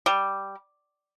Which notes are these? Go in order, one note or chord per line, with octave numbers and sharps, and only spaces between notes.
G3